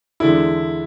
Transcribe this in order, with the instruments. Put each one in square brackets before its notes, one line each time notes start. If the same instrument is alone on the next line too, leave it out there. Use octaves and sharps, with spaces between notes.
[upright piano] E2 D3 G#3 D4 A4 [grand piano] E4